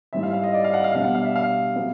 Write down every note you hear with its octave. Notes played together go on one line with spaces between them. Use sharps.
G#2 E3 G3 C4 E5
F5
F5
D#5
D5
F5
F#5
F5
B2 G3 B3 D4 F5
F#5
F5
E5
F5
F#3 B3